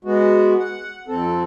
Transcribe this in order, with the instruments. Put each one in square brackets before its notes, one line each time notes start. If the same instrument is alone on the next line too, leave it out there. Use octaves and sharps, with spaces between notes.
[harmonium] G#3 B3 F#4
F#5
F2 C4 A4